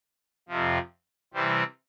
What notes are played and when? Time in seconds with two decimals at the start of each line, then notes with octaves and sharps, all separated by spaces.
0.48 F2 C3 F3
1.33 C3 E3 G3 C4